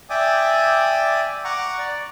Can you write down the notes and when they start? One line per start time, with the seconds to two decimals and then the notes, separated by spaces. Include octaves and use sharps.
0.10 D5 E5 G5 G#5 D6 D#6
1.44 F#5 A#5 C#6 D6
1.79 D5